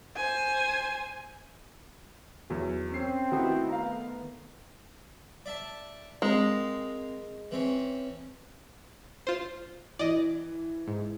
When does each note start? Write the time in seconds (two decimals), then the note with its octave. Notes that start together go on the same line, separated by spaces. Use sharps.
0.16 C5 G#5
2.50 E2 F#3
2.92 C4 C#4 C7
3.32 D#3 A3 B3 E4 F#4
3.69 F5 A#5
5.46 D5 E5 A5
6.22 G#3 C4 A#4 F5
7.51 E3 C4 C#4
9.27 F4 C5
9.99 E3 D5 D#5
10.88 G#2